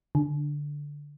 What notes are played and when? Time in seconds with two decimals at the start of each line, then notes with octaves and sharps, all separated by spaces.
0.15 D3